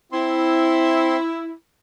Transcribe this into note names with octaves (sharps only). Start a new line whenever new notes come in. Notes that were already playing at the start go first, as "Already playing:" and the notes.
C4 E4 C6